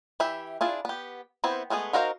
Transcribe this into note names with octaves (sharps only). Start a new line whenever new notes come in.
E3 E4 G4 E5
D4 E4 F4 G#4
B3 G4
B3 C4 E4 C5
G#3 A3 B3 G#4
D#4 F#4 A#4 C5 F5